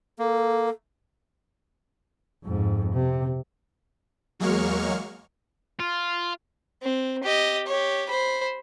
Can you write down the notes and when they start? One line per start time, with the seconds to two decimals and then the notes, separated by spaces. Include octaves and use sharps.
0.19 A#3 A4
2.44 F2 G#2
2.93 C3
4.40 E2 F#3 G#3 A#3 C#6 F6
5.80 F4
6.83 C4
7.23 G4 D#5
7.67 G4 C#5
8.09 C5 B5